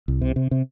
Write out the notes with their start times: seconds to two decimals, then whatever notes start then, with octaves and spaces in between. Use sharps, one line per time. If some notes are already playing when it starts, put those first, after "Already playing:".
0.08 C2
0.21 C3
0.36 C3
0.51 C3